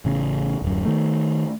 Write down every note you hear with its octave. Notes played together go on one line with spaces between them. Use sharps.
A1 C#3
D1 F#2
D#3 A3